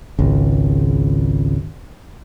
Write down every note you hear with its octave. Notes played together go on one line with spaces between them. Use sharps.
G#1 C#2